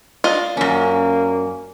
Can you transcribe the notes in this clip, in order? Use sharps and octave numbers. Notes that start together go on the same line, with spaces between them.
D4 F4 D#5
F#2 A#3 C#4